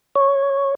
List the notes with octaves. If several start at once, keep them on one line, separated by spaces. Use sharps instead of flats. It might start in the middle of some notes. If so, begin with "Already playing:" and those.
C#5